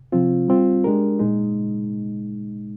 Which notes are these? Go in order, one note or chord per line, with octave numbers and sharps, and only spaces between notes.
C3 F3 C4 F4
G3 C4 F4
G#3 D4 G4 A#4
A#2 G#3 D#4